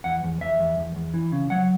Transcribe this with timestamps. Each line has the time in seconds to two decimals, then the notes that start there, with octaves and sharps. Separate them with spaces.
0.04 E2 F#5
0.23 E2
0.41 E2 E5
0.59 E2
0.77 E2
0.96 E2
1.14 E3
1.32 C#3
1.50 F#3 F#5